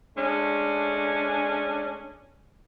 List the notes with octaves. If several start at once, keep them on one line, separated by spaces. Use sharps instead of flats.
G#3 A3 C#4 D4